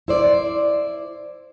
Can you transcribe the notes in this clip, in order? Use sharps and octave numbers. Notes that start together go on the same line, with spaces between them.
E4 C5 D5